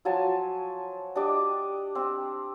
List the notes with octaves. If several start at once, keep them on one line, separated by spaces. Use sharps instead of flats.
F3 F#3 G#5 A5
D4 G4 D#5 D6
C4